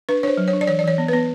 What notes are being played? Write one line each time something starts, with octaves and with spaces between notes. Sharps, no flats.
D4 B4
D4 C5 C#5
F#3
C#5
D4
D5
E3 C#5
D5
E3 C#5
B3
B3 B4